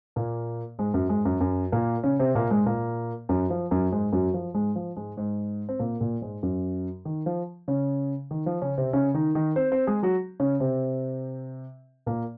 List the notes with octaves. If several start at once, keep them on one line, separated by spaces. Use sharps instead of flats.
A#2 A#3
G#2 G#3
F#2 F#3
G#2 G#3
F#2 F#3
F#2 F#3
A#2 A#3
C#3 C#4
C3 C4
A#2 A#3
G#2 G#3
A#2 A#3
F#2 F#3
F3
F#2 F#3
G#2 G#3
F#2 F#3
F3
G#2 G#3
F3
G#2 G#3
G#2 G#3
C4
A#2 A#3
A#2 A#3
G#2 G#3
F#2 F#3
D#3
F3
C#3 C#4
D#3
F3
C#3 C#4
C3 C4
C#3 C#4
D#3 D#4
D#3 D#4
C4 C5
C4 C5
G#3 G#4
F#3 F#4
C#3 C#4
C3 C4
A#2 A#3